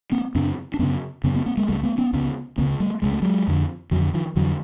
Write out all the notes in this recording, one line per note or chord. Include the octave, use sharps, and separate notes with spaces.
A#3 C4
F#2 C#3 C4 D4
D4
F#2 C#3 B3 C#4
F#2 C#3 B3 C#4
A#3 C4
A#3 C4
G#3 A#3
C#2 C#3 G3 A3
A3 B3
B3 C#4
C#2 C#3 B3 C#4
C#2 C#3 A#3 C4
G3 A3
C#2 C#3 G#3
A3
F#3 G#3
F2 D3
F2 D3 E3 F#3
D#3 F3
F2 D3 E3 F#3